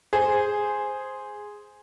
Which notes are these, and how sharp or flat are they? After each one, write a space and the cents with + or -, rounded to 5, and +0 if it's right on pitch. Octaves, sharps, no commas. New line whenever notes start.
G#4 +0 C5 +0